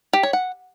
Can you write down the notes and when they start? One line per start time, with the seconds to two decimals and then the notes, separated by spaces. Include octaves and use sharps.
0.13 G4
0.23 C#5
0.33 F#5